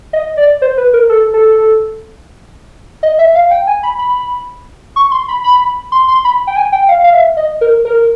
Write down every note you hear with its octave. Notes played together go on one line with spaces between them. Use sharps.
D#5
D5
C5
B4
A#4
A4
A4
D#5
E5
F5
G5
G#5
B5
B5
C#6
C6
B5
B5
C6
C6
B5
G5
G#5
G5
F5
F5
E5
D#5
A#4
A#4